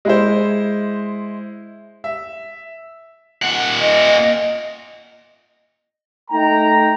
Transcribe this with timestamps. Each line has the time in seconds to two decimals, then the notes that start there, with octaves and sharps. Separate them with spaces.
0.05 G#3 E4 C5
2.04 E5
3.43 A#2 F#5
3.81 D#5
6.31 A3 D#4 G5 A#5